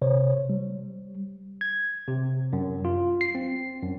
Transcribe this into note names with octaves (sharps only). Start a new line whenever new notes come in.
C3 C5 C#5
G3
G#6
C3
F#2
F4
C7
C4
F#2